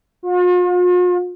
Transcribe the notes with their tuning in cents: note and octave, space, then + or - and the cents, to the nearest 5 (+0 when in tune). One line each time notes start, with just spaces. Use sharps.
F4 +45